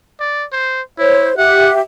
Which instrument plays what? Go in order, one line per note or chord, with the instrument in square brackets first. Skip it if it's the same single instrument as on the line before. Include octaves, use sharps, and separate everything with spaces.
[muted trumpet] D5
C5
[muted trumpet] E4 [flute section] C5 C#5
[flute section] G4 E5 [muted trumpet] F#5